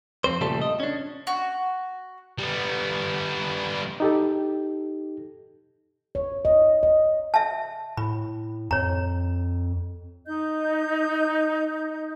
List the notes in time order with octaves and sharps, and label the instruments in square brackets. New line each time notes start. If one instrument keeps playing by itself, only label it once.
[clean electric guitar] F2 C4 C5
A#2 C#3 F3 G3 A3 A4
D#5
C#4 D4
[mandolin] F#4
[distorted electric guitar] G3 B3
[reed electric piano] D#4 G4 A4
[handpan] C#5
D#5
D#5
[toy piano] E5 A5
[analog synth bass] A2 [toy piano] B5
[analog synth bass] F2 [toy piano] C#5 A#5
[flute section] D#4 D#5 G6